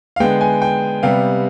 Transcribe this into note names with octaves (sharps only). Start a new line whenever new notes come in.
F5
D3 G#3 B3 G5
G#5
G5
C3 G3 B3 F5